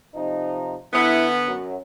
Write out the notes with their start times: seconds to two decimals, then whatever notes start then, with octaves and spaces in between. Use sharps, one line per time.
0.15 C3 F3 D#4
0.93 D3 B3 E4
1.47 F#2 F#3